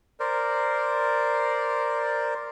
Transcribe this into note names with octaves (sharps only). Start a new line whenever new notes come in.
A#4 C5 D5